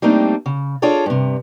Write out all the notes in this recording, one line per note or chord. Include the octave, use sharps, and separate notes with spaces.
G3 A3 A#3 C4 D4 D#4
C#3
D4 F4 G#4 A4 C#5 D5
G2 C3